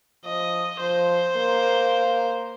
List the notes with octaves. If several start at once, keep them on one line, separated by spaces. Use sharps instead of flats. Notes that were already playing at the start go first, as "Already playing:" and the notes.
F3 D#5
F3 C5
A#3